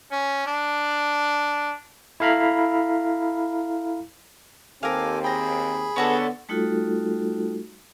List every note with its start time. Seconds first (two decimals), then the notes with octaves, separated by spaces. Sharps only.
0.11 C#4
0.46 D4
2.20 E4 A4 F5 A#5 B5
4.83 D#2 C4 G4 A4 A#4 F5 G#5
5.24 G#4 G5 A#5 B5
5.96 D3 B3 C#4 F#4 A4
6.49 G3 A3 D#4 F4 F#4 A4